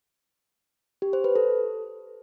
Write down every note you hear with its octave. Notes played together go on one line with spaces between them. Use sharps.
G4
C5
B4
A4